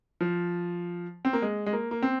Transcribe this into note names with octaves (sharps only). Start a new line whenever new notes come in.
F3
C4
A#3
G#3
G#3
A#3
A#3
C4